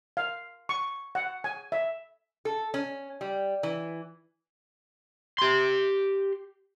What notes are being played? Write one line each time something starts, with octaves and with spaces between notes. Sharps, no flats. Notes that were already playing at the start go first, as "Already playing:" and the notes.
F5
C#6
F#5
G#5
E5
A4
C#4
G3
E3
G4 C6